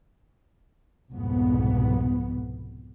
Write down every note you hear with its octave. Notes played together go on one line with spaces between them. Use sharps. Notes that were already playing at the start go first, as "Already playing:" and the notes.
C2 F2 G#2 B2 B3